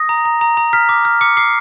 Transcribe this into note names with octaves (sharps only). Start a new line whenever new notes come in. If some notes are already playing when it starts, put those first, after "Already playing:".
Already playing: D#6 A#6
A#5
A#5
A#5
A#5
F6 B6
D6
F6
D6 C#7
D6 C7